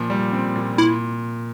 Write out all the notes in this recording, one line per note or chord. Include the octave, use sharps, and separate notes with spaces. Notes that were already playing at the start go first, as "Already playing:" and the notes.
Already playing: A#2 F3
G3
C4
A#2
A#2 E4